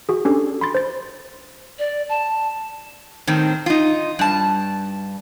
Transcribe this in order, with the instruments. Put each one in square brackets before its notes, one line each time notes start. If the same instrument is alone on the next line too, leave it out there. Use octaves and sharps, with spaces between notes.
[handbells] F#4 G#4
C#4 D4 G4 A4
B5 C6 A6
C5 A6
[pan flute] D5
A5
[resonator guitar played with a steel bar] A2 D#3 C4
D#4 F4
G2 A5